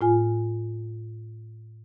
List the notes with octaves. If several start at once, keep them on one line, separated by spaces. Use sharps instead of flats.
A2 F4 G#5